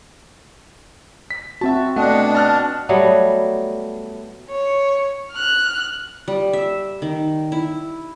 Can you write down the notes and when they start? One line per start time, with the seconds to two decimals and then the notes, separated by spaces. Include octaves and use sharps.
1.30 B6
1.61 C4 F#4 E5 A5
1.96 B2 A3 D4 D#5 F#5
2.35 A5 F6 F#6
2.89 F#3 G3 A3 B3
4.50 C#5
5.32 F6 F#6
6.28 G3
6.53 E5
7.02 D#3
7.52 E4